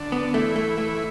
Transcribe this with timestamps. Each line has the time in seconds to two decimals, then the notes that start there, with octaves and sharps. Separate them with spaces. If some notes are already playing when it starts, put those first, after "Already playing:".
Already playing: D3 D4
0.12 B3
0.34 E3 A3 E4
0.56 A3
0.78 A3